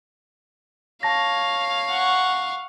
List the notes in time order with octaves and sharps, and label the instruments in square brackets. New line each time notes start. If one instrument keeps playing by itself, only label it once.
[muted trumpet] C#5 [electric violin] F5 [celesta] A5 A#6
[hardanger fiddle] F#5 C#6